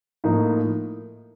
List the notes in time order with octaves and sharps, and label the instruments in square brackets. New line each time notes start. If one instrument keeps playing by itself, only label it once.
[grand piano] A2 F3 A#3 D#4